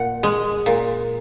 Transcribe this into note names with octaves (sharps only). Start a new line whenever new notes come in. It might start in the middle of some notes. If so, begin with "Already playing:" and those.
Already playing: A#2 F#5
G#3
A#2